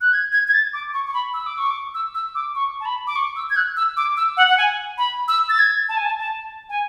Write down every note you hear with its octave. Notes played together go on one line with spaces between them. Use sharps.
F#6
G#6
G#6
G#6
A6
D6
C#6
C#6
B5
E6
D6
C#6
D6
E6
E6
D6
C#6
A5
B5
D6
C#6
E6
G#6
F#6
E6
D6
E6
F#5
F#5
G#5
B5
E6
A6
G#6
A5
G#5
A5
A5
G#5